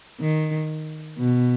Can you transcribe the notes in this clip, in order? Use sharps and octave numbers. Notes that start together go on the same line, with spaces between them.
D#3
B2